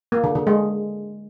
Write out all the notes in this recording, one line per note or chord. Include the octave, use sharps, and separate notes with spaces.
A#3
D3
D3
G#3